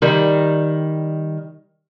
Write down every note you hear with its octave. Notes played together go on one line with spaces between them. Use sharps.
D#3 G3